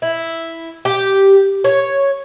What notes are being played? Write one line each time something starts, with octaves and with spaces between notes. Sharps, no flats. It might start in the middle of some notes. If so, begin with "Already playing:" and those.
E4
G4
C#5